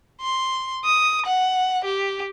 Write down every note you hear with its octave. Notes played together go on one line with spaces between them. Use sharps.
C6
D#6
F#5
G4